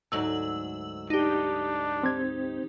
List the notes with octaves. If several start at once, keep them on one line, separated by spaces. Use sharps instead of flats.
D2 G#2 F#3 E6 F#7
D4 D#4 G4
C4 C5 G#6